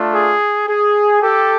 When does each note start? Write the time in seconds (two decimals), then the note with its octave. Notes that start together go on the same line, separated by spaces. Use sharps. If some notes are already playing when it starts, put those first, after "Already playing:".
Already playing: A3 D4 F4
0.14 G#4
0.68 G#4
1.22 G4 A4